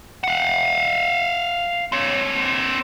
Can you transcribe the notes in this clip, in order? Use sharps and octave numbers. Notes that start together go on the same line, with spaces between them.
F5 F#5
C4 C#5